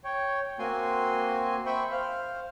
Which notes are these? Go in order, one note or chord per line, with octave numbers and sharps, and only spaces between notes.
C#5 G5
A#3 C4 F#4 G#5 C6
C5 E5 G5 B5 C#6
C5 F5